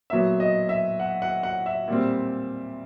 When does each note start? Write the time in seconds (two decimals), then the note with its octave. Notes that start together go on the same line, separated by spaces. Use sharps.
0.10 A#2 F#3 B3 E5
0.40 D#5
0.69 E5
1.00 F#5
1.22 F#5
1.43 F#5
1.66 E5
1.88 A#2 G3 C4